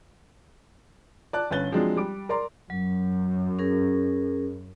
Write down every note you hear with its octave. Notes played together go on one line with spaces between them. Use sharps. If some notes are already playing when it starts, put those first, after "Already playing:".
D5 A5 F#6
G1 C#4 B4 F#6 A6 G7
F3 F#3 G#3 C4 D4
G3 D6 D7
A#4 D5 A#5 C6
F#2 F#3
C#4 G#4 A#4